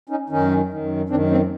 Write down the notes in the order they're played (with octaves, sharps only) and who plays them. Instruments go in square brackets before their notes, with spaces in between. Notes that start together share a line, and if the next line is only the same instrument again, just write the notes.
[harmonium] C#4 D#4
F#2 D#3 C#4 D#4
F#2 D#3
F#2 D#3 C4 D4
A#3 C4